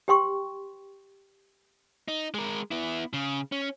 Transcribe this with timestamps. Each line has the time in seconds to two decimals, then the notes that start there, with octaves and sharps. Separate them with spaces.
0.08 G4 B4 G5 C6 C#6
2.08 D#4
2.34 G#3 A#4
2.71 B3 E4
3.13 C#3
3.52 C#4